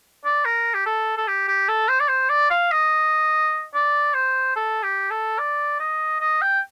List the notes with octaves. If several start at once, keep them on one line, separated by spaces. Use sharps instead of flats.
D5
A#4
G4
A4
A4
G4
G4
A4
C5
D5
C5
D5
F5
D#5
D5
C5
A4
G4
A4
D5
D#5
D#5
G5